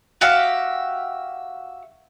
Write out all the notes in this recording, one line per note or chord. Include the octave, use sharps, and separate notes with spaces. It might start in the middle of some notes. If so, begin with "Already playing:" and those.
F#4 G4 E5 F5